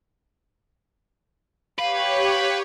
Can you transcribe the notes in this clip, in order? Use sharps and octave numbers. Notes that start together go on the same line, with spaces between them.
G4 B4 C#5 F5